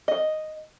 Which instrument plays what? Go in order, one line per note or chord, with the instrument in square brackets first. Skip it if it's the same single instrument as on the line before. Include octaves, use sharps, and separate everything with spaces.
[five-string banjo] D#5